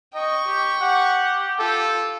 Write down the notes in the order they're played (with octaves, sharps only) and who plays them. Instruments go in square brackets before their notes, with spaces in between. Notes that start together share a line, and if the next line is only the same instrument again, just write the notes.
[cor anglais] D#5 [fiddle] G5 C#6
[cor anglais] G4
[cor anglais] G4 [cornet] F#5
[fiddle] F4 [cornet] A4